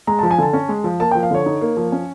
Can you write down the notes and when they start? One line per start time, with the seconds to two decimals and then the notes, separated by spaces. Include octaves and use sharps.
0.07 G#3 A#5
0.19 F3 A5
0.31 G#5
0.38 D3 A5
0.53 C#4
0.69 G#3
0.84 F3
1.00 A#3 A5
1.11 G5
1.15 F3
1.23 F5
1.31 D3 C#5
1.46 D#4
1.61 A#3
1.77 F3
1.92 C#4